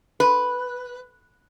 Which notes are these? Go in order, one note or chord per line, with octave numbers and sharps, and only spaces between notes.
B4